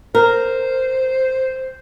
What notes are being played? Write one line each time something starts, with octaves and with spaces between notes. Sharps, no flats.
A#4 C5